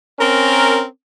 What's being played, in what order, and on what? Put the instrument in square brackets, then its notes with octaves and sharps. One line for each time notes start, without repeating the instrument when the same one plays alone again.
[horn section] C4 C#4 A#4